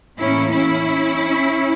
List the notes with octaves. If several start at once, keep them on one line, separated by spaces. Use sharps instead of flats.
A2 E3 A#3 C#4 E4
C#4 E4